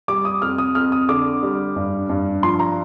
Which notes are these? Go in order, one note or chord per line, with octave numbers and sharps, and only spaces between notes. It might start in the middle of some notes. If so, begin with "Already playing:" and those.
G3 D6
D#6
F2 F6
D#6
F2 F6
D#6
D3 D6
G3
G2
G2
F3 C6
A#5